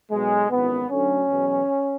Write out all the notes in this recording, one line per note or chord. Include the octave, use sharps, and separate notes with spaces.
B1 B2 F#3 G#3
G#1 F#2 E3 B3
D2 D3 F#3 C#4
E2 B2 F#3